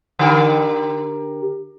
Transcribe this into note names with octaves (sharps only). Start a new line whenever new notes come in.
D3 G4 A#4